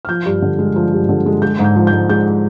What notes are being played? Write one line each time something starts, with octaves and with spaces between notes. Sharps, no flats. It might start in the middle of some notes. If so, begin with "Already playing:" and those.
F6
F3 G6
G2
D3
G#3
F3
G2
D3
G#3
G#3 G6
G#2
G6
F3
G#2 G6
G#3 G6